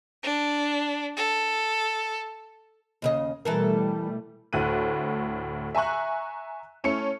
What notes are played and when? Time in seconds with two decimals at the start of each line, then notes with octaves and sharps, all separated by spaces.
0.23 D4
1.17 A4
3.02 D#2 C#3 D#5
3.45 B2 E3 G3 A3 A4 A#4
4.53 D2 A2 F#6 D#7
5.75 E5 G#5 A#5 C#6 F#6
6.84 A3 C#4 E4 C#7